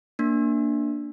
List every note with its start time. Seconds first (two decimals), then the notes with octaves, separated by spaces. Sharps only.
0.19 A#3 D4